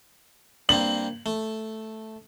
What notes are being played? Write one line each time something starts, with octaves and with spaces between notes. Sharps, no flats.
G2 A#3 C4 F#7
A3